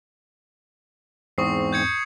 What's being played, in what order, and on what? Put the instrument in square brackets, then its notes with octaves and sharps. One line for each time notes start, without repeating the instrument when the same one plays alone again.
[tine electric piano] E2 G#2 C4 [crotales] C#6 D#6 C7
[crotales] G6 G#6 C#7